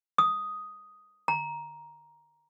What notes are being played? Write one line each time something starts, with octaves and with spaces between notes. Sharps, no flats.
D#6
A#5